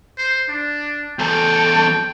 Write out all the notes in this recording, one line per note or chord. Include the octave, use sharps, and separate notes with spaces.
C5
D4
E2 A4 G5